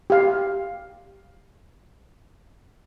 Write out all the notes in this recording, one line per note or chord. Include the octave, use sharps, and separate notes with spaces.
G4 F5